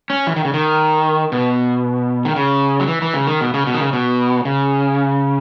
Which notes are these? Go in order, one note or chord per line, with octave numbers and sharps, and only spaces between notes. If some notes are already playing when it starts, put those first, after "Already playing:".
C#4
E3
D#3
C#3
D#3
B2
D#3
C#3
F#3
E3
E3
C#3
D#3
B2
C#3
B2
D#3
C#3
B2
C#3